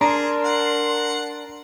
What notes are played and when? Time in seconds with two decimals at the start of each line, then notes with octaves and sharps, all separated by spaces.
0.01 D4 G#4 A#4 A#5 C6
0.44 F#5